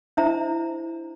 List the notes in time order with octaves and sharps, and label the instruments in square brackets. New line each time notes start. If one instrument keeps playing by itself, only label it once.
[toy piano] D4 E4 C5 E5 A#5